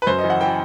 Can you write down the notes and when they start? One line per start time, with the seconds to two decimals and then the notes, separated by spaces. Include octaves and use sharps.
0.02 B4
0.07 F#2 C5
0.18 D#5
0.24 E3
0.30 F#5
0.41 E3 G5